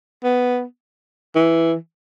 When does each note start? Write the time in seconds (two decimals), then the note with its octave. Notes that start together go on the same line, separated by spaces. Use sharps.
0.24 B3
1.36 E3